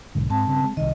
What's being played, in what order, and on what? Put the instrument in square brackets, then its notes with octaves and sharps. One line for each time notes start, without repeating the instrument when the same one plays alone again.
[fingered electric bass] B1 G#2 D3
[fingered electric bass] G#2 [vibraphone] C4 A5
[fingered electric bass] G2 C#3
G#3
[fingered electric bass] C2 D#3 [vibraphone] D#5